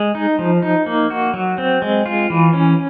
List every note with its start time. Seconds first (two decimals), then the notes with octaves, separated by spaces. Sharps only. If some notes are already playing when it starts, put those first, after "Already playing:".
Already playing: G#3
0.15 D#4
0.39 F3
0.62 D#4
0.86 A#3
1.10 F#4
1.34 F#3
1.58 C4
1.82 G#3
2.06 F4
2.30 E3
2.53 C#4